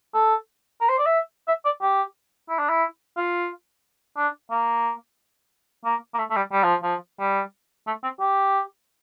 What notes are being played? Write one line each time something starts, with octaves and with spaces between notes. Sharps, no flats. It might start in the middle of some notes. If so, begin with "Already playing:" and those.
A4
A#4
C5
D5
E5
E5
D5
G4
E4
D4
E4
F4
D4
A#3
A#3
A#3
A3
A3
G3
G3
F3
F3
G3
A3
C4
G4